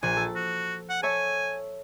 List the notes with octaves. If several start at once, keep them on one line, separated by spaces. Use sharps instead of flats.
A#1 G#5
A4
F#4
F#5
A4 C#5 E5 G#5